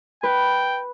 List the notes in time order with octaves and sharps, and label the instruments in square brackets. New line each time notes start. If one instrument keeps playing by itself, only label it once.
[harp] B4 [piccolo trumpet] G5